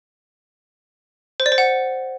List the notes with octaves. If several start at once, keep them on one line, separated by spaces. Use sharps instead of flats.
C5
D5
C5
F#5